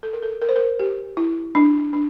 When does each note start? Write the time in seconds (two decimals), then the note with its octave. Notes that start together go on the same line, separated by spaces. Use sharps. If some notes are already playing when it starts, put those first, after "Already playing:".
0.03 A4
0.13 A#4
0.23 A4
0.42 A#4
0.49 C5
0.56 A#4
0.79 G4
1.17 E4
1.55 D4
1.93 D4